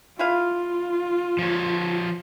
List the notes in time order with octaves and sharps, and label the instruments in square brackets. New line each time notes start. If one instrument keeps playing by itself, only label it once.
[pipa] E4 G#4 F5 [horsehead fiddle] F4
[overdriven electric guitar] F3 C#5